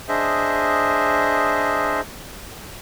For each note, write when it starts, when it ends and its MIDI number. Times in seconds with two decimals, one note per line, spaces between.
0.09 2.01 62
0.09 2.01 68
0.09 2.01 72
0.09 2.01 75
0.09 2.01 76